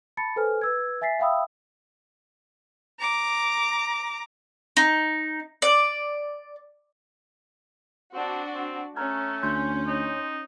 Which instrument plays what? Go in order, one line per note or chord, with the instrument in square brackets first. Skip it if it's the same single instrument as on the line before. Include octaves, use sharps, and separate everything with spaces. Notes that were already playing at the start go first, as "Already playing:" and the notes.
[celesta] A5 B5 A6 C#7
A4 B4 C5 G#5 F6
B4 E6 G#6
E5 G#5 A6 B6 C7
E5 F5 G5 B5 D#6 E6
[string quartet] A#5 D6
[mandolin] D#4
D5
[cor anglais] C4 [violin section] D4 F#4
[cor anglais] C4
[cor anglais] A3 [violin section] C#4 [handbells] A#5 F6 G#6
[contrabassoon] D2 [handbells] C6 G6
[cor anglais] D#4